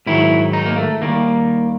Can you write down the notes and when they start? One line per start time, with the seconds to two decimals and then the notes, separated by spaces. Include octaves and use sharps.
0.06 G#2 D#3 F#3 E4
0.53 D#4
0.66 A#3
0.78 A3
1.01 D#2 D#3 G3 A#3